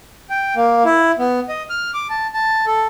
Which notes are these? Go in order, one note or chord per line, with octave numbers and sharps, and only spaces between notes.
G5
A#3
E4
B3
D#5
F6
D6
A5
A5
A4